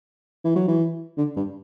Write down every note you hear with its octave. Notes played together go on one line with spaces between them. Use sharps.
E3
F#3
E3
D3
G2